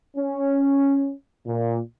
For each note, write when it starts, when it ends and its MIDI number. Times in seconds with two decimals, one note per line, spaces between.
0.17 1.12 61
1.46 1.79 46